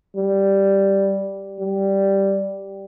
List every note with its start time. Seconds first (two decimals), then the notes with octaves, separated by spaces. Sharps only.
0.16 G3
1.60 G3